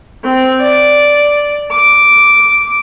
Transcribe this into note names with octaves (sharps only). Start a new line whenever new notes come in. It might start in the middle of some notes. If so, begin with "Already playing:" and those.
C4
D5
D6